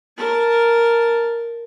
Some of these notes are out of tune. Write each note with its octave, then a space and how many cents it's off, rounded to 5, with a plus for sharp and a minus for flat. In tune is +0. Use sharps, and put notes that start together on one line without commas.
A#4 +0 A5 +0